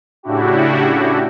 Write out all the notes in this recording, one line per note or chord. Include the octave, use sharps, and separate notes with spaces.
A2 C#3 D4 E4 F#4 G4